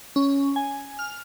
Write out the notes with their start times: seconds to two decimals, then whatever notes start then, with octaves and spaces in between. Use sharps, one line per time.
0.16 C#4
0.56 G#5
0.99 F6